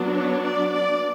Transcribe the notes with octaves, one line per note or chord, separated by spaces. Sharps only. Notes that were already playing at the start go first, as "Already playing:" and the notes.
Already playing: F#3 B3 D4
C#5
D5
D5